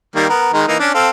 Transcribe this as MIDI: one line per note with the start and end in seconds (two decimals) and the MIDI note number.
0.16 0.27 51
0.16 0.27 55
0.16 0.27 58
0.29 0.53 59
0.29 0.53 70
0.53 0.67 51
0.53 0.67 56
0.53 0.67 70
0.68 0.76 52
0.68 0.76 58
0.68 0.76 63
0.80 0.90 61
0.80 0.90 62
0.95 1.09 60
0.95 1.09 69
0.95 1.09 77